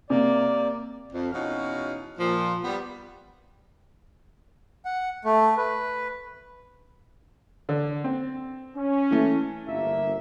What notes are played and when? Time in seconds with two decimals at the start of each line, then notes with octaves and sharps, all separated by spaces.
0.10 C3 A#3 D5
1.12 F2
1.32 E2 B2 C#4 D#4 F#4 F5
2.18 A#2 F3
2.64 G3 B3
4.85 F#5
5.25 A3
5.57 B4
7.69 D3
8.04 C4
8.76 C#4
9.11 E3 A3
9.67 G1 A#3 E5